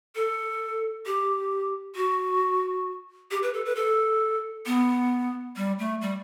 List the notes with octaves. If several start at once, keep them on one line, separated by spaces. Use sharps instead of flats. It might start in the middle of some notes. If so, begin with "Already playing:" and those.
A4
G4
F#4
G4
B4
A4
B4
A4
B3
G3
A3
G3